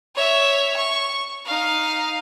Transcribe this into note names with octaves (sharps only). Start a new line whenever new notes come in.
C#5 E5
C#6
D#4 F5